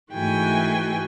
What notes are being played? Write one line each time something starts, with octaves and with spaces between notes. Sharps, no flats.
G#2 E3 A3 F#4 G5 G#5